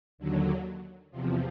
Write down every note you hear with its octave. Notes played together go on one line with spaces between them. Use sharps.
D#2 D3 F#3
E2 C3 F3